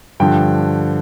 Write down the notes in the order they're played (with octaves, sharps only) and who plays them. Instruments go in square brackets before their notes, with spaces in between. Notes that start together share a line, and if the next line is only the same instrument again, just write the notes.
[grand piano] G2 D3 F3 G5